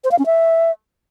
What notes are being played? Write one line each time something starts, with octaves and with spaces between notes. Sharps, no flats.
C5
F5
C#4
E5